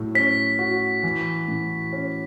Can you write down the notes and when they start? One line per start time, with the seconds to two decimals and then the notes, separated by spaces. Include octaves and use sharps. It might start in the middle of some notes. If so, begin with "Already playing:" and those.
Already playing: A2 F#3
0.15 C#4 B6
0.59 F#4
1.03 E3
1.48 A2
1.93 C#4